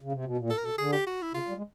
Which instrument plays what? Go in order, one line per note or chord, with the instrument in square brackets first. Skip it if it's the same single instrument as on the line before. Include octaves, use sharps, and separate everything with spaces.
[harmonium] C#3
C3
B2
A#2
[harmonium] A2 [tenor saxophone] A4
[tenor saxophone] A#4
[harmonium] B2 [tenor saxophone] A4
[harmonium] D3 [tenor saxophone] G#4
[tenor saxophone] G4
F#4
E4
[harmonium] C#3 [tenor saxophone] F4
[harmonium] G3
G#3